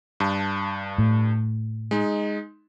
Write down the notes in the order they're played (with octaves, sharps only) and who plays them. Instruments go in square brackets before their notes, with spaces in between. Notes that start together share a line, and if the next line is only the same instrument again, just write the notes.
[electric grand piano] G2 A5
[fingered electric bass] A2
[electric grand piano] G#3 D#4